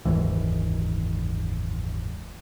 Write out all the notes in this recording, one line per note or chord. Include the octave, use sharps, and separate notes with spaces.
F#1 D#2 G#2 E3